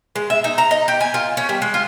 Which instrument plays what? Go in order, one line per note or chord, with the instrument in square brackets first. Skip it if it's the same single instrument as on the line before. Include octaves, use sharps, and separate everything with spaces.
[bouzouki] G#3
E5
D#4
A#5
D#5
G4
G#5
F4
C#4
G3
G#3
F4